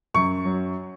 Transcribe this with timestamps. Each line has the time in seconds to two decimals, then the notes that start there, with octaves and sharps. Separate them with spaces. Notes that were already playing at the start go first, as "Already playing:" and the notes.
0.14 F#2 C#6
0.45 F#3